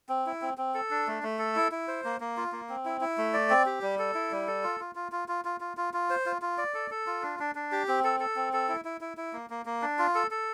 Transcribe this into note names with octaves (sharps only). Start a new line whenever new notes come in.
C4
E4
C4
C4
A4
D4
A3
A3
A4
E4
E4
C5
A#3
A#3
F4
A#3
C4
E4
E4
A3
D5
C4
G4
G3
A4
E4
G3
A4
F4
F4
F4
F4
F4
F4
F4
F4
F4
C5
F4
F4
D5
A4
A4
F4
D4
D4
D4
G4
C4
A4
A4
C4
A4
E4
E4
E4
E4
A#3
A#3
A#3
D4
F4
A4
A4